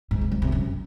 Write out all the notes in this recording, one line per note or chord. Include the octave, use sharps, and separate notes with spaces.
G#2
C3
F2
C3
F#2